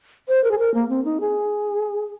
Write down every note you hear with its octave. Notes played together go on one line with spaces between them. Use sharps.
C5
A#4
G#4
A#4
A#3
C4
D#4
G#4